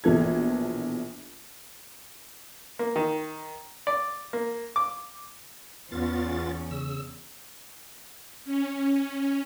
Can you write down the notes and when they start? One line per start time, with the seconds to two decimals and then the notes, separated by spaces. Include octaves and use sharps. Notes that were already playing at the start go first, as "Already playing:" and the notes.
0.04 A#1 B2 E3 A4 G#6
2.79 A#3
2.96 D#3
3.87 D5
4.33 A#3
4.76 D6
5.92 E2 B3 C#4 F4 A6
6.71 C#3 E6
8.45 C#4